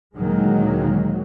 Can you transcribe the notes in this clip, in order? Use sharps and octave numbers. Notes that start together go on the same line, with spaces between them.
D2 A#2 D#3 F#3 G#3 A#3